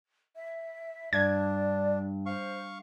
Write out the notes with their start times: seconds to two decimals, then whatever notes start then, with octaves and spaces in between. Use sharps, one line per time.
0.36 E5
1.13 G2 D4 D5 G#6
2.26 C5 F5 C#6